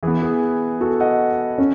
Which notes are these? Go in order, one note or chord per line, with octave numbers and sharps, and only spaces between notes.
E3 B3 G#4
G#4
F#4 A4
D#5 F#5
C#4